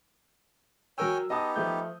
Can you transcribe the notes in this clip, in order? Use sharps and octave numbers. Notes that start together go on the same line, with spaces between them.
F#3 A#4 C#5 G5 G#5 E6
B3 D#4 G4 D#5 A5 D#6
F3 A3 G6